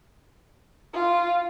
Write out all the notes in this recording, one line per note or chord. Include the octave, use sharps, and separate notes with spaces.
F4